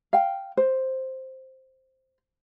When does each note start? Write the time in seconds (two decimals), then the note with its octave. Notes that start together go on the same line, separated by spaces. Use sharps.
0.13 F5 G5
0.57 C5